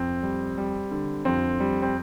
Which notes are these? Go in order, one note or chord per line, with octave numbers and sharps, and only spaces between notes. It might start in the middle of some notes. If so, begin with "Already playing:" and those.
Already playing: F2 C4
G3
G3
D3
F2 C4
G3
C4